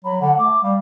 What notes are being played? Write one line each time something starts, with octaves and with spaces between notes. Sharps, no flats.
F#3 B5
D3 F#5
A3 D6
G3 F5